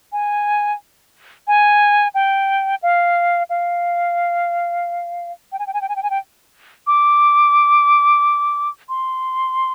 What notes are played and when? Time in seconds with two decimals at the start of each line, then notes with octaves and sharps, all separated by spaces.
0.12 G#5
1.47 G#5
2.14 G5
2.82 F5
3.49 F5
5.52 G5
5.59 G#5
5.67 G5
5.73 G#5
5.81 G5
5.89 G#5
5.96 G5
6.03 G#5
6.10 G5
6.87 D6
8.89 C6